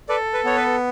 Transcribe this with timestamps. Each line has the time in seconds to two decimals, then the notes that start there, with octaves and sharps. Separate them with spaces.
0.09 A4 B4 D5
0.33 B4
0.44 B3 C#5
0.56 B4